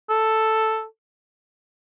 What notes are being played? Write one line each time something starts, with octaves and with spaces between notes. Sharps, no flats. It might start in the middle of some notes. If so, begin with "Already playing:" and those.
A4